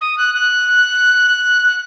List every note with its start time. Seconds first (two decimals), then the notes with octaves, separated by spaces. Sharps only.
0.01 D#6
0.18 F#6
0.34 F#6
1.68 F#6